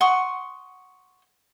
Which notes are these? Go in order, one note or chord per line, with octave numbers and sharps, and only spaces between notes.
F#5 C6 C#6 D#6